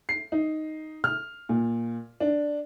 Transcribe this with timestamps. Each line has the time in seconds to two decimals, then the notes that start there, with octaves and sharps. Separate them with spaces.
0.09 C7
0.32 D#4
1.04 F6
1.49 A#2
2.20 D4